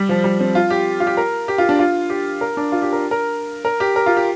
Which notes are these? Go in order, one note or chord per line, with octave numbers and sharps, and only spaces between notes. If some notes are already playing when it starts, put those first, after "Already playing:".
Already playing: G3
F3
G3
C4
F4
G4
F4
G4
A#4
G4
F4
D4
F4
G4
A#4
D4
F4
G4
A#4
A#4
A#4
G4
A#4
F4
G4